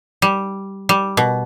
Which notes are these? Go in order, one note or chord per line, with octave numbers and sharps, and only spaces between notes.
G3
G3
B2